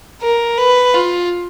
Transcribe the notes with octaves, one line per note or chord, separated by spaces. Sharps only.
A#4
B4
F4